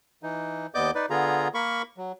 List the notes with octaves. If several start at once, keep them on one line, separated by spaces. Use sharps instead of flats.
E3 D#4
D#2 B3 D5 D#5 D6 G6
D#4 B4 D5
D3 B3 F4 G#4 A#5
A#3 A#4 B5 C#6
F#3